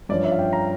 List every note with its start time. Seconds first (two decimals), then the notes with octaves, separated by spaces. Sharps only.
0.09 G2 F3 C#4 D5
0.24 E5
0.32 F5
0.38 G5
0.53 A#5